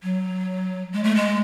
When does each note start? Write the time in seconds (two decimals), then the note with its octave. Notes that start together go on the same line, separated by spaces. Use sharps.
0.03 F#3
0.93 G#3
1.04 A3
1.15 G#3